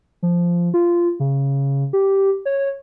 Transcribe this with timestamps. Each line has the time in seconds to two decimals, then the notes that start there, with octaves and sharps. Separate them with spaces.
0.23 F3
0.74 F4
1.20 C#3
1.93 G4
2.46 C#5